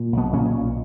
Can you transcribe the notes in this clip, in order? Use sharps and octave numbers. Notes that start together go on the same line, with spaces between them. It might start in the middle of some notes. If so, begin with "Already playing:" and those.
Already playing: A#2
B1 B2 B3
A#2 C#3 C#4
B1